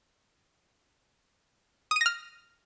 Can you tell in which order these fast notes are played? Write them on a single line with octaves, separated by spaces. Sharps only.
D#6 D#7 A#6 F6